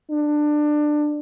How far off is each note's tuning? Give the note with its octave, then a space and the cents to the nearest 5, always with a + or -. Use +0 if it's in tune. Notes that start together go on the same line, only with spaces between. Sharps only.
D4 +20